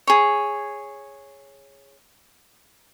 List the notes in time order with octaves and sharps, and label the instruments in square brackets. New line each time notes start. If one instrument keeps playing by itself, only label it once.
[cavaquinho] G#4 C#5